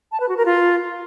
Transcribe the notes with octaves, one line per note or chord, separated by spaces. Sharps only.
A5
B4
F#4
A#4
F4